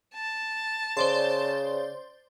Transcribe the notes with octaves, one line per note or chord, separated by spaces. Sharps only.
A5
C#3 C5 D5 C6